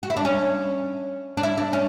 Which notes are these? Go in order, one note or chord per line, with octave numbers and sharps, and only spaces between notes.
F#4
E4
D4
C#4
D4
E4
D4
C#4